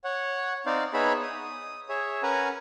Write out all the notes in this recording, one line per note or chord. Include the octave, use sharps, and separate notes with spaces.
C#5 F#5
C4 D#4 C5 D5 F5
B3 D#4 G#4 C#5 E5 B5
D#6
G#4 C#5 E5
C#4 A#4 B4 F#5 G#5 A#5